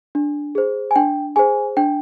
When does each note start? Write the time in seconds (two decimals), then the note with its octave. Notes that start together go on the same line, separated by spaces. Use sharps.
0.15 D4
0.55 G#4 C5
0.91 G#5
0.96 D4 G5
1.36 G#4 C5 G#5
1.77 D4 G5